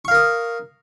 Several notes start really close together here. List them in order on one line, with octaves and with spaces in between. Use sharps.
C#6 F5 A#4 D#6